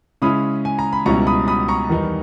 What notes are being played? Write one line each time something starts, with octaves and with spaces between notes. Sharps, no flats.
C#3 G#3 C#4 E4 B5 D#6
G#5
A#5
B5
C#2 B2 G3 C#4 E4 A#5 C#6
B5 D#6
B5 D#6
A#5 C#6
E2 D#3 G3 B3 D#4